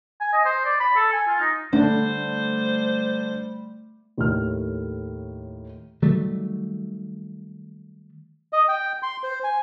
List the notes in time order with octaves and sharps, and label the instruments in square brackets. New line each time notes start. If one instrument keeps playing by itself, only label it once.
[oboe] G#5
D#5
C5
D5
B5
A4
G#5
F4
D#4
[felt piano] D3 D4 [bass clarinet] G3 [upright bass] A3 [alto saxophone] C5
[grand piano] D#2 A2 A3 F6
[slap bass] D#3 F#3 G3 A3
[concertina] D#5
G5
C6
C5
G#5